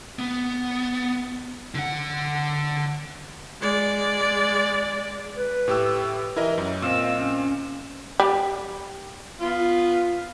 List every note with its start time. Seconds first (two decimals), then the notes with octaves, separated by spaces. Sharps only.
0.19 B3
1.75 D3 F#5
3.61 G#3 D5
5.37 B4
5.68 A2 G4 E6
6.36 E3 E4 A#4 D#5
6.58 F#2 C#4
6.82 A#2 C4 D#5 F5 E6
7.20 C#4
8.20 G3
9.40 B3 F4